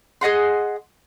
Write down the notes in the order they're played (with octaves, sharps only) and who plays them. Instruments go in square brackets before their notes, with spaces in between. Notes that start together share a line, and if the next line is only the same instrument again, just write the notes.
[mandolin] G#4 D#5 F#5 C6